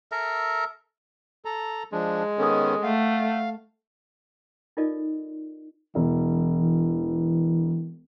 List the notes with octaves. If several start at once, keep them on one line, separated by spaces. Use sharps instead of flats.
A4 A#4 E5 A#5
A4 A#5
F3 G#3 D4
D#3 B3 C#4 A4 D#6
A3 F5 F#5
D#4 F4 A4 A#4 D5 D#5
E1 E3
E3